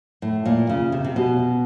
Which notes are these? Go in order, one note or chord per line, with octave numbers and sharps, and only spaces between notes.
A2
A#2
C#3
C3
C3
B2